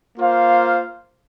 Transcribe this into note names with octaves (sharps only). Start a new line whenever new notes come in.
A#3 F4 C5 F5